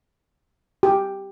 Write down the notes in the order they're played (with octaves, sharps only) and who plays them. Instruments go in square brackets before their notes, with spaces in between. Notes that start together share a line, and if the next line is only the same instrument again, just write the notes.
[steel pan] G4